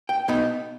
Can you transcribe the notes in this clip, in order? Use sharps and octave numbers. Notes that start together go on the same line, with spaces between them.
G5
B2 B3 D#4 B5